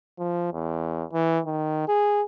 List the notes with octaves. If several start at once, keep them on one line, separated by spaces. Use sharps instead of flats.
F3
E2
E3
D#3
G#4